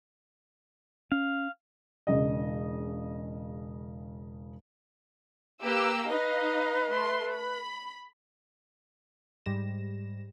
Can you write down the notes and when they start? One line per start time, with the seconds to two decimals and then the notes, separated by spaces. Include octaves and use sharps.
1.12 C#4 F5
2.07 E1 C#3 D#5
5.63 A#3 G4 B4 E6
6.09 D#4 B4 D#5 F5
6.91 A3 C6
7.34 B5
9.46 G#2 G3 A#6 E7